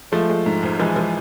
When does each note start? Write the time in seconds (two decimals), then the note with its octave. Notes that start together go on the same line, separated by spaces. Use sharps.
0.12 F3 G#3 A3
0.29 G#3
0.46 G#2
0.63 G#1
0.79 E3 F3 G#3
0.96 F3